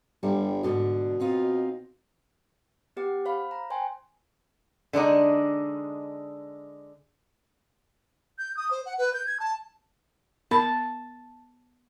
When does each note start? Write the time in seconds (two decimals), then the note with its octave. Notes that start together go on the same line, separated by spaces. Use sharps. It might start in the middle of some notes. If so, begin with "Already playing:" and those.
0.23 G1 G3
0.63 G#2 B2 D3 D4
1.20 C4 D#4 F4
2.97 B3 G4 F#5 D6
3.25 C5 F5 B5
3.51 A#5
3.70 C5 G5 G#5 C6
4.93 D3 G#3 D4 D#4
8.38 G6
8.57 D#6
8.71 C5
8.86 F#5
8.98 B4
9.14 G6
9.27 G#6
9.40 A5
10.51 B3 A#4 A5 B5